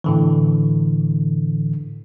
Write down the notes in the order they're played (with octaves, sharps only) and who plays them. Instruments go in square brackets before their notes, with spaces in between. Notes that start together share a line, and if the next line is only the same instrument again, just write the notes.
[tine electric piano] A2 D3 E3